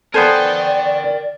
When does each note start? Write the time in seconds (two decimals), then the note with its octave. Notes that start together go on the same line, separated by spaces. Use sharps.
0.14 B3 A4 A#4 C5 D5 G5 G#5